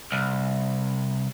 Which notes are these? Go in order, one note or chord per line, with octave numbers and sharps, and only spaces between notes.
C2